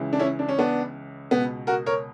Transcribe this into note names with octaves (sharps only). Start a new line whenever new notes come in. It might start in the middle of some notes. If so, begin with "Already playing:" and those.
Already playing: C#2 C#3 E3
D4
C#4 E4
D4
C#4
B3 D4
C#2 B2 B3
F#4 A#4
A#4 C#5